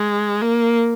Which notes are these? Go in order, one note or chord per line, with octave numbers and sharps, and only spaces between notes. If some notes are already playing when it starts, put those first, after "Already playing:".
Already playing: G#3
A#3